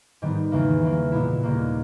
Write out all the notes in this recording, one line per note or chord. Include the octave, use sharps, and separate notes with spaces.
G#2 D#3 G3 B3
E2 C#3 E3 A#3
C#3 E3 A#3
A#2 G#3 B3 E4
D#2 C#3 G3 A#3